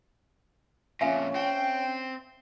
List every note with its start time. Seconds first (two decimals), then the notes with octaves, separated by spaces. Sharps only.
1.01 F2 A#2 C#4 E5 F5 G#5
1.35 C4 G5